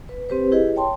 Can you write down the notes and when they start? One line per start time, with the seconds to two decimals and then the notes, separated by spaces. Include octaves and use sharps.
0.09 B4
0.29 C4 G4 B4 C5
0.52 E4 G4 G#4 B4 D#5
0.76 C#5 G5 A5 C6